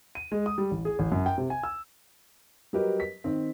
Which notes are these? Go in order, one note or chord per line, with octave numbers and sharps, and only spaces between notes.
D#7
G#3
D#6
G3
A1
G#4
A1
F#2
G5
C3
G#5
E6
F#3 G3 G4 A#4 B4 D#5
B6
D#3 C4